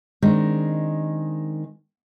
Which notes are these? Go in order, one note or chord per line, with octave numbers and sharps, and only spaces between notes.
D#3 G#3 C4 D4